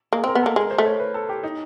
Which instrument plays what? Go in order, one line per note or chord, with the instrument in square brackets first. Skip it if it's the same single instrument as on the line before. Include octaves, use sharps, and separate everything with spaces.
[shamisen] A#3 [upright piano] G#4
[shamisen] C4 [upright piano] A#4
[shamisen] B3
[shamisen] A#3 [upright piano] A4
[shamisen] G#3 [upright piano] A#4
[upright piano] C5
[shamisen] A3
[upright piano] C#5
B4
A4
G4
D#4